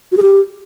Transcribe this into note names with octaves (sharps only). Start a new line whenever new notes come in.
F#4
G#4
G4